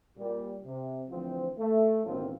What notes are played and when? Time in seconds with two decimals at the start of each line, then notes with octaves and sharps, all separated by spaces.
0.17 A#2 G3
0.64 C3
1.09 D2 E3 F3 C4
1.58 A3
2.04 A1 B2 D#3 F#3 C4 F4